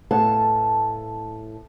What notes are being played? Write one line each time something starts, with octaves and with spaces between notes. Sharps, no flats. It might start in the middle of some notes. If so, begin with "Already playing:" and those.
A2 B3 A4 B4 F5 A5